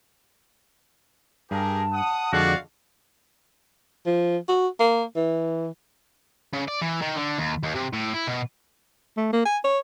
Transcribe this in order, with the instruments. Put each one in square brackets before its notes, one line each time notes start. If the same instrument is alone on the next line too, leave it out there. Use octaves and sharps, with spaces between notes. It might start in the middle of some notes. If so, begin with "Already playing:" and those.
[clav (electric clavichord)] G2 [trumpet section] G4 G#4 A#4 [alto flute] A5
[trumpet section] F#5 D#6
[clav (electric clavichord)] F2 D3 G#3 [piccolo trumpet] F#4 [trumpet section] D5 F5
[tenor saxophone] F3
F#4
A#3
E3
[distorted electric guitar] C#3
D5
E3
D#3
D3
D#2
D#2
C3
A2
E4
B2
[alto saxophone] A3
A#3
G#5
C#5